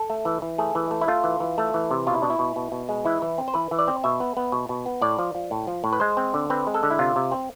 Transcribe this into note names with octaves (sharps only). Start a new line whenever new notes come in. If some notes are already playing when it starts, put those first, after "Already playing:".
Already playing: A4
A3
E3
E3
A3 G#4
E3
A3
E4
A3 F4
E3
E3
A3
E3
C3
B2 F4
E4
B2 D4
E4
B2
B2
B2
G#3
E3 E4
E3
C4
C5
E3 B4
E3
D5
C4
B2 E5
B3
B3
B2
B2
B3
A2 D5
F3
F3
A2
F3
A2
B4
G#3 C5
C4
D3
C4 B4
G#3
A4
D3
E4
C3 F4
C3
C4